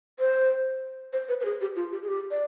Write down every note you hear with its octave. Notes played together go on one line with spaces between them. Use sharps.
C5
C5
B4
B4
G#4
G4
F4
G4
G#4
G4
D5